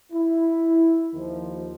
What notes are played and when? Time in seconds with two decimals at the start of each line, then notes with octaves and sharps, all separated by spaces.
0.12 E4
1.14 D#2 D#3 F3